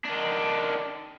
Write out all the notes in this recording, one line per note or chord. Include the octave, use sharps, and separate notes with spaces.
D#3 D4